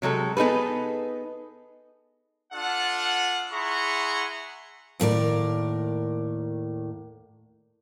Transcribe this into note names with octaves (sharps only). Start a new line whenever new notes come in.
C3 F#3 G#3 A4
B3 D#4 G#4 A4 B4
D4 F4 A4 F#5
E4 G#4 F#5 A#5 C6 C#6
D#2 A2 A#4 D5